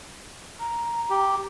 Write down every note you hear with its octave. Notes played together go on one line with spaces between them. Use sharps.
A#5
G4